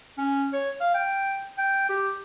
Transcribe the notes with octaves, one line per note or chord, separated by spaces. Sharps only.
C#4
C#5
F5
G5
G5
G4